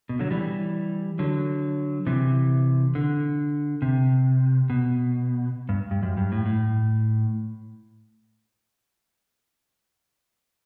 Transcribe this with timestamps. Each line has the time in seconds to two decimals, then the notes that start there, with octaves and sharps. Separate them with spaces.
0.09 B2
0.19 D3 F#3
0.31 E3 G3
1.19 D3 F#3
2.07 C3 E3
2.95 D3
3.82 C3
4.70 B2
5.69 G2
5.91 G2
6.03 F#2
6.17 G2
6.32 A2
6.46 A2